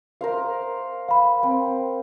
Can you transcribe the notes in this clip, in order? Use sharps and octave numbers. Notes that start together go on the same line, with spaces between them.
A#4 C5 F5
F5 B5
C4